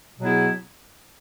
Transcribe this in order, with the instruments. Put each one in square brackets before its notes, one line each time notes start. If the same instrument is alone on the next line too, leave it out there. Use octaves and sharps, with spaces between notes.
[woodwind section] B2 F#3 B3 E4 G#4